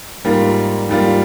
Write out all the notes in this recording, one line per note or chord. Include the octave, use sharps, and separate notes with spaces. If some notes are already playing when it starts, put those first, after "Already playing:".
G#2 G3 A#3 F4
G#2 G3 A#3 F4